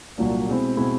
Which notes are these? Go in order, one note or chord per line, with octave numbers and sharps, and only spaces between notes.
C2 A#2 F#3 A#3 D4
B2 G#3 C4 E4
B2 G#3 C4 E4